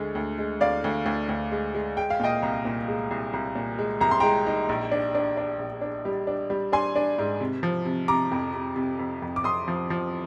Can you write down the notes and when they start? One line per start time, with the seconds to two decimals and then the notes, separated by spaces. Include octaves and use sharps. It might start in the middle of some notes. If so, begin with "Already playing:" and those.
Already playing: D2 D3 G#3
0.15 D2
0.38 G#3
0.60 D2 D5 F5
0.84 D2
1.06 D2
1.29 D2
1.52 G#3
1.75 G#3
1.97 G#3 G5
2.10 F5
2.20 A#2 D#5 G5
2.42 C2
2.65 A#2
2.88 G#3
3.11 C2
3.33 C2
3.55 A#2
3.79 G#3
4.01 C2 A#5
4.11 C6
4.20 G#3 G5 A#5
4.46 D#4
4.69 A#1
4.92 D4
5.15 D4
5.37 D4
5.59 A#1
5.81 D4
6.05 G3
6.27 D4
6.50 G3
6.72 D4 G#5 C6
6.96 D4
7.18 G#2
7.40 C3
7.63 F3
7.85 C3
8.08 C3 A#5 D6
8.32 F2
8.54 C3
8.76 C3
8.99 F2
9.22 F2
9.36 D6
9.44 F2 C6 D#6
9.68 F3
9.90 F3